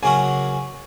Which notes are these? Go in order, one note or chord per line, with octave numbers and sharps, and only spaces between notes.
C#3 F#3 A#3 C#4 F#4 G#5